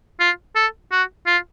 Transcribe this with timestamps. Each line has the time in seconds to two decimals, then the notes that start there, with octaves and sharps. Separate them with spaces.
0.20 F4
0.56 A4
0.92 F#4
1.27 F4